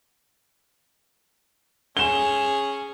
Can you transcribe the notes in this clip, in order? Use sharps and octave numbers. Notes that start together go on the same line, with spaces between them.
C#4 G#4 E7 G7